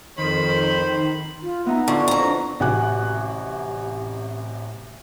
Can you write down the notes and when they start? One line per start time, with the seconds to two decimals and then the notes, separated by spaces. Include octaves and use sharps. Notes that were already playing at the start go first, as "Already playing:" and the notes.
0.18 F2 D#3 C5 B5
1.43 F4
1.66 B3 D#4 E5 A#5
1.88 D3 E4 F4 C#6
2.08 F2 A#5
2.25 D4
2.60 A1 C3 F#4 G#5 D6 F#6